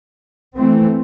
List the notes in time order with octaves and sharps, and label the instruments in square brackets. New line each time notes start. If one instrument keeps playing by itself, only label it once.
[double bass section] E3 A3 C4